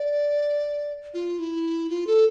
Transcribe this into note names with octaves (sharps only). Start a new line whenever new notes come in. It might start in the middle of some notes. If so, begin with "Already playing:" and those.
Already playing: D5
F4
E4
F4
A4